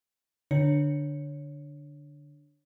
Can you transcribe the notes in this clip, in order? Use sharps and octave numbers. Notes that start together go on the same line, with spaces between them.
D3 D4 C#5 C#7